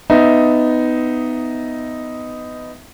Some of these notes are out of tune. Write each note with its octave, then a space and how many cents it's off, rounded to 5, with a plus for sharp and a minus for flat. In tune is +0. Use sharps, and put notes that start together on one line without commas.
B3 +20 D#4 +0 E5 +0